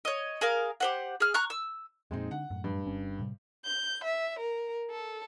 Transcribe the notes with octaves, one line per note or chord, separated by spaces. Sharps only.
C#5 D#5
G#4 A#4 F5
G4 C5 F#5
G#4 F6
A#5 C#6 F6 F#6
E6
F2 A#2 G#3 C4 D#4
D3 F#5
F#2 A2
G2
G1 C#4
A2 C3 G3
G6
E5
A#4
A4